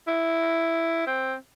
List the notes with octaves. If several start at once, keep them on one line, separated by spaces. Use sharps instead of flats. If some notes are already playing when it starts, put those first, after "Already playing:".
E4
C4